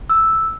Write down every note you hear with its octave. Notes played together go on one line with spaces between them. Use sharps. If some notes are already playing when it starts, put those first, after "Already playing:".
E6